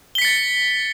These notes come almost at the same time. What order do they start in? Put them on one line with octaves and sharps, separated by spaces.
G7 B6 C#7 A6